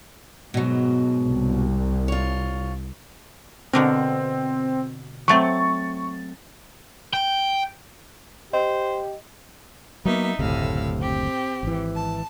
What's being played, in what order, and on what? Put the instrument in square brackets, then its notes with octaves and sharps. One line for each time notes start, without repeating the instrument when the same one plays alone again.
[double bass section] G#2 [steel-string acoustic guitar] B2 F#3
[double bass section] C2
[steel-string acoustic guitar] F4 C#5
[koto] B2 D3 A#4 [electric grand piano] C4
[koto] F#3 A3 C4 [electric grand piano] C#6 A6
[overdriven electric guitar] G5
[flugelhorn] G4 [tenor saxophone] C5 [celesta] D#5
[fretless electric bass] F#3 A#3 [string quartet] B3 D#4 E5
[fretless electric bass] F#1 D2 C3 [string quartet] A2 F5 E6
[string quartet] C4 G4
[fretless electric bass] G#1 E3
[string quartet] A5